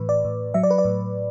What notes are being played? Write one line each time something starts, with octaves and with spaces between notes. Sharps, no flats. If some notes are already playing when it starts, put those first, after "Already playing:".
Already playing: A2 E3 B4
D5
A2
F#3 E5
D5
B4
D5
A2